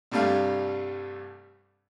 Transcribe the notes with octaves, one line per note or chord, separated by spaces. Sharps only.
C2 G2 G3 A3 F5